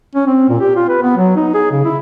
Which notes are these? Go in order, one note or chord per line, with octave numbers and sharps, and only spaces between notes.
C#4
C4
A#2
G4
F4
B4
B3
F#3
D#4
G#4
C#3
E4